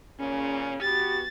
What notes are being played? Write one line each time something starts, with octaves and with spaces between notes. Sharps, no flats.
A#2 C#3 C#4
B3 F#4 G4 A6